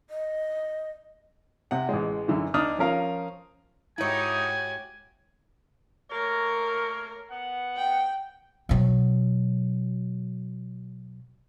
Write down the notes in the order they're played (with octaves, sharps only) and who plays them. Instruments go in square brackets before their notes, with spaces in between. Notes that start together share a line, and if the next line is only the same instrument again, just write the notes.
[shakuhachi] D#5
[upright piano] C3 F#5
A1 G#3
F#2 D3 E3
D2 D4 D#4 D#6 F6
F3 C#4 A#4 F5
[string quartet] G#2 F#4 G4 [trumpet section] D#4 [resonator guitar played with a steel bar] E4 C#5 [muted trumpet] G#5
[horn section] A3 A#3 C#5 [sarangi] A#4
[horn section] B3 F#5
[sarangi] G5
[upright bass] B2 F#3